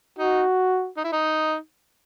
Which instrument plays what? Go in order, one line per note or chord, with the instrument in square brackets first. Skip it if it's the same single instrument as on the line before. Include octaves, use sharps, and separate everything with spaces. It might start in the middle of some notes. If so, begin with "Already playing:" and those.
[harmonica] D#4 [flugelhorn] F#4
[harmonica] D#4
E4
D#4